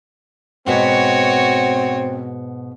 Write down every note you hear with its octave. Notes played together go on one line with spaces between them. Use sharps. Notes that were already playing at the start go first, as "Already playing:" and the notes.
G#2 B2 C4 F#4 B4 C#5